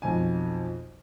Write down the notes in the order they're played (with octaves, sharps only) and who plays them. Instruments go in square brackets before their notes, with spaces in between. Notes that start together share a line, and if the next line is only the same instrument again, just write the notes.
[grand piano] B1 F2 G#5